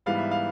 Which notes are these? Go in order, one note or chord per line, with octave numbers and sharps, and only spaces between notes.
G#2 E3 G3 B3 F5
E5
F5